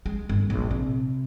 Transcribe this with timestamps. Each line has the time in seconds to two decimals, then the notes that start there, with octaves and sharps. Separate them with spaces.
0.06 G#3
0.29 G1
0.50 A#1
0.71 C3